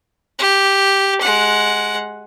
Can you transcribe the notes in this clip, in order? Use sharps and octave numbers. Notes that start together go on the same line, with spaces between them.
G4
G#3 F#5